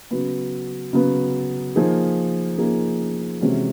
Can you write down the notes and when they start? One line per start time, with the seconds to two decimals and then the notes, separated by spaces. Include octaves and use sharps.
0.11 C#3 F#3 B3
0.93 C#3 F#3 B3
1.76 F3 A#3 D#4 G#4
2.58 F3 A#3 D#4 G#4
3.41 C3 E3 G#3 C#4 F#4